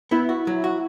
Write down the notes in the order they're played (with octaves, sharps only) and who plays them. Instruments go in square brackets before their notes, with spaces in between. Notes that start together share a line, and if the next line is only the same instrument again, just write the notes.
[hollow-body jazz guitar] B3 [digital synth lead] E4
[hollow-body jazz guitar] F#4
F#3
F#4